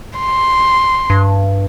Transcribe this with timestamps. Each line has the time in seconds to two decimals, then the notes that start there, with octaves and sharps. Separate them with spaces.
0.19 C6
1.10 G2